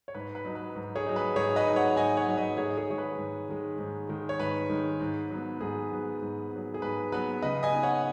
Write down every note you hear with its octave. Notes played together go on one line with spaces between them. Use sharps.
C#5
G#2 B4
B4
F#3 D#4
B4
G#2
G#4 C#5
F#3 D#4
B4
G#2 G#4 C#5
B4 D#5
F#3 D#4
C#5 F#5
G#2 D#5 G#5
C#5 F#5
F#3 D#4
B4 D#5
G#2 G#4 C#5
G#4 C#5
D#3 G#3 C#5
B4
G#2
D#3 G#3
G#2
D#3 G#3
C#5
G#2 B4
D#3 G#3
G#2
F#3 B3
G#2 G#4
F#3 B3
G#2
F#3 B3
G#4
G#2 B4
F#3 B3 B4
C#3 B4 D#5
D#5 G#5
B3 D#4
C#5 F#5